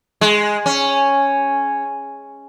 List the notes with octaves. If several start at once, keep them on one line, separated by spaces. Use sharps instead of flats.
G#3
C#4